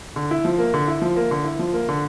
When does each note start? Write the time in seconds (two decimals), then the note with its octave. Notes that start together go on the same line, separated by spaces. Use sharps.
0.16 D3
0.31 E4
0.45 F3
0.59 A#3
0.74 D3
0.88 E4
1.02 F3
1.16 A#3
1.31 D3
1.44 E4
1.59 F3
1.73 A#3
1.89 D3